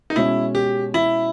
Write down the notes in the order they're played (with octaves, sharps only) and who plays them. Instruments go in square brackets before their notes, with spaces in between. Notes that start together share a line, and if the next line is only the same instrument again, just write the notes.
[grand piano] D#4
[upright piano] B2 G#3 C#4 [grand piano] E4
[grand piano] G4
E4